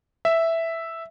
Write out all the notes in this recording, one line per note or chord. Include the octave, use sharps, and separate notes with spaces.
E5